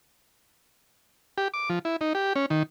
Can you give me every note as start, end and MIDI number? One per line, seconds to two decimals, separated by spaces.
1.38 1.48 67
1.54 1.69 86
1.69 1.79 53
1.85 1.96 64
2.01 2.13 63
2.15 2.33 67
2.36 2.46 61
2.50 2.63 51